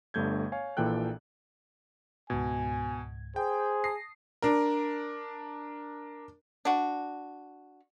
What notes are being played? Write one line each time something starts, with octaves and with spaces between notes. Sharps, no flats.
G1 G2 A3 G6 G#6
C#5 F5 G#5
A#1 A#2 E3 A4 G5 F#6
C#2 G#2 B2 G#5 G#6
G#4 C5 G5
A5 D#6 A#6 C7
D4 A#4
D4 F#4